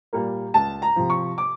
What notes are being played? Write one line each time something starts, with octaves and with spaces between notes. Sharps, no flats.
A#2 G3 A#3
C#2 A5
A#5
C3 F3
C#6
D6